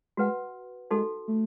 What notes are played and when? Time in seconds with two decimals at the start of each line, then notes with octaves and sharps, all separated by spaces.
0.17 G#3 F#4 B4 F#5
0.91 G#3 D#4 F#4 A4
1.28 A3